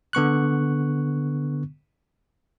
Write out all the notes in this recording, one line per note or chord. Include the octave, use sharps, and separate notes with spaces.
D3 B3 C#6 F#6